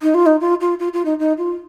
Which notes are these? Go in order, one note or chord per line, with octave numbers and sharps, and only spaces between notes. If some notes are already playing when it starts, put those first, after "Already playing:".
D#4
F4
D#4
F4
F4
F4
F4
D#4
D#4
F4